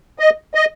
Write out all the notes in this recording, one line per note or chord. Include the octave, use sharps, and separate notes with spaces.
D#5
D#5